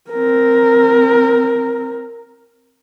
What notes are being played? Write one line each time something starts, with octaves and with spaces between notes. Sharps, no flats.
C4 A#4